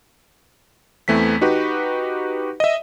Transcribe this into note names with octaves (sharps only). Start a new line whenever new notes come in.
E2 E3 A3 C4 B6
D#4 F#4 G4 B4
D#5 E5